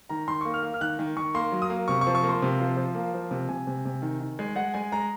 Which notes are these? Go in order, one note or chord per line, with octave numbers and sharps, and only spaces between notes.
D#3 A#5
D#3 C6
A#3 C#6
F6
A#3
F6
D#3 F#6
D#3
D#3 C#6
A#3 C6
F#3
D#6
A#3
C3 C#6
C#6
F3
C#6
A#3
C6
C3
F3
F3
A#3
F3
C3
C3 G#5
C3
C3
D#3
D#3
G#3
G#3 F#5
G#3 G#5
G#3 A#5